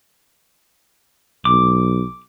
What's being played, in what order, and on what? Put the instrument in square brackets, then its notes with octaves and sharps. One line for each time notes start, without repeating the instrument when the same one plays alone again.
[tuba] B1 [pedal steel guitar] D6